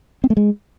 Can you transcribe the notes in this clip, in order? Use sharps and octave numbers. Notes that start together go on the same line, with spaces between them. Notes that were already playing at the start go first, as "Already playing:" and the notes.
C4
A3
G#3